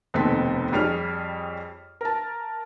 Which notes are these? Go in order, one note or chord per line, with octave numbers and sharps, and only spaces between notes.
F1 D#2 B2 C4 A4 B6
F2 G3 G#4 C#5 F6
A#4 A5